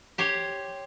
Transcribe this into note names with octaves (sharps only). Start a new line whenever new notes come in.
G4 C5 C#5